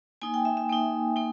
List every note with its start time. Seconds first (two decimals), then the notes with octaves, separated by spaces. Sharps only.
0.22 A#3 D#4 G#5
0.34 G5
0.45 E5
0.57 E5
0.69 A#3 D#4
1.16 A#3 D#4